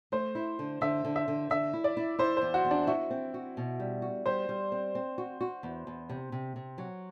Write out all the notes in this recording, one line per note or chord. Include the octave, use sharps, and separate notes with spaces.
A3 C5
E4
D3
D3 E5
D3
E5
D3
D3 E5
E4
D5
E4
E4 C5
E2 C5
F#4
E2
D4
E4 F#4
C4
F#4
B2
G3
F#4
G3 C5
G3
C4
C4
F#4
F#4
E2
E2
C3
C3
C3
F#3